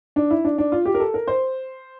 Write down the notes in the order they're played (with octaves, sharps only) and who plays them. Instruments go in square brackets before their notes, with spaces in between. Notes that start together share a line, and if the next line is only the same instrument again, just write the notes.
[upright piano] D4
E4
D4
D4
F4
G4
A#4
A4
A#4
C5